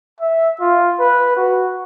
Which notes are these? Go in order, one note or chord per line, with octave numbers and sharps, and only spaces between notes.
E5
F4
B4
F#4